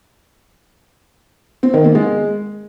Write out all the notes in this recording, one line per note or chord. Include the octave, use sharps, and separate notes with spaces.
C4
D#3
A#3
G#3